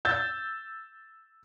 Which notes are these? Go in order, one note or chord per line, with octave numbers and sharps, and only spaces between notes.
E6 G6 A6